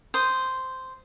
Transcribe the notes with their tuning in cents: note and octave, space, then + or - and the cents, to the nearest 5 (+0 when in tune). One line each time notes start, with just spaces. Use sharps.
C5 -5 D#6 +0